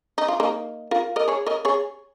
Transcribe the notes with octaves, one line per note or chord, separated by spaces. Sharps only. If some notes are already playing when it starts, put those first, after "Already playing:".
D#4
F4
A#3 D#4
F4 A#4
A#4 D#5
G#4 C#5
A#4 D#5
G#4 C#5